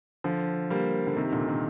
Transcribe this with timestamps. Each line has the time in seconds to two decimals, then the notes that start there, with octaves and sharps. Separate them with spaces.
0.24 D3 F3
0.70 G3 A#3
1.07 D3
1.17 C3 D#3
1.32 A#2 D3
1.48 C3 D#3